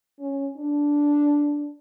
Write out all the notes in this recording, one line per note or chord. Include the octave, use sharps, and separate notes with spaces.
C#4
D4